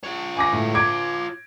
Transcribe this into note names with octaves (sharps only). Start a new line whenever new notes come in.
F4 C#5
G#5 D6 A#6
A2
D6 G#6 D7